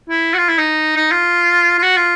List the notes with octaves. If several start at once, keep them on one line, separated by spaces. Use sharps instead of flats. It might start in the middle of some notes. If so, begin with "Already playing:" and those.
E4
F#4
F4
E4
D#4
D#4
F4
F4
F#4
F4